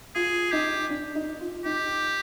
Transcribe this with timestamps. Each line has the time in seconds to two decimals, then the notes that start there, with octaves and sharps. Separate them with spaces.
0.15 F4 G#4
0.52 D#4 G4
0.90 D4
1.15 D#4
1.41 F4
1.65 D#4 G4